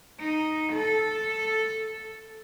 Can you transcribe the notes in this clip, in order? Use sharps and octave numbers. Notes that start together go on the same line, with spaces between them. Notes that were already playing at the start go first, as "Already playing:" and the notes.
D#4
A4